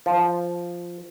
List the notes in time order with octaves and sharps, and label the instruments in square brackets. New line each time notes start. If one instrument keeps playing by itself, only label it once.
[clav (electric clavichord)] F3